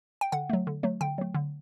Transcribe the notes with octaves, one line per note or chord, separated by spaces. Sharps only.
G5
D3 F#5
F#3 A3
D3
F#3 A3
D3 G5
F#3 A3
D3